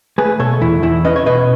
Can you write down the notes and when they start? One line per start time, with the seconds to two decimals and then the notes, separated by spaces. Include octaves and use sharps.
0.18 A3 G#4 B4
0.39 B2 A4 C#5
0.61 E2 E4
0.83 E2 E4
1.05 C#4 B4 D#5
1.16 C#5
1.26 B2 B4 D#5